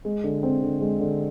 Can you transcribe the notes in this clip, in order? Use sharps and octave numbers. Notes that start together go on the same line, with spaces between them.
G#3
D3
C4
D3
G#3
D3